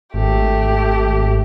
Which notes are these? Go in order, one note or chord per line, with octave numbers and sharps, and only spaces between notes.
G#1 A3 G4